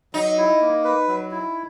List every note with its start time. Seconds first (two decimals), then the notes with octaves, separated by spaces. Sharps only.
0.14 F#3 D#4
0.38 E4
0.61 A#3
0.84 B4
1.08 F#3
1.31 E4